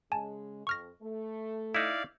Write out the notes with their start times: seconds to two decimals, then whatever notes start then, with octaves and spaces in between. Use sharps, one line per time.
0.12 C#3 G#3 G#5 A5
0.67 F2 C#6 F6 A#6
1.01 A3
1.75 D#4 E4 D5 F5